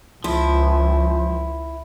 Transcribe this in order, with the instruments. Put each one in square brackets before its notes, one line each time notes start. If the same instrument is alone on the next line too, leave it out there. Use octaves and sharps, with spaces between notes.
[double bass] C#2 [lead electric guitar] F3 [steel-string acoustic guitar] E4